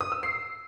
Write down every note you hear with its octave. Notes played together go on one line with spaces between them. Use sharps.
D#6
E6
C7